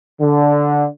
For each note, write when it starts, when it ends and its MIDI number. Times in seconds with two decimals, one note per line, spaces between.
0.21 0.87 50